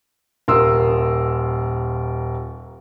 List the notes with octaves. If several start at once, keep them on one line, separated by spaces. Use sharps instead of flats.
D#1 A#4 C6 D#6 E6